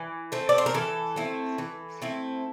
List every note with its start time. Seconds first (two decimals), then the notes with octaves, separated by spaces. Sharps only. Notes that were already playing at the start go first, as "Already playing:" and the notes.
Already playing: E3
0.32 A3 C4
0.49 D5
0.58 C5
0.66 A#4
0.74 E3 A4
1.16 A3 C4 E4
1.58 E3
2.02 A3 C4 E4